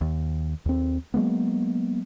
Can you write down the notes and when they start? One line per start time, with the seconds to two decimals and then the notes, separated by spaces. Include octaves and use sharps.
0.01 D#2
0.66 D#2 C4
1.14 F#3 G#3 A#3 B3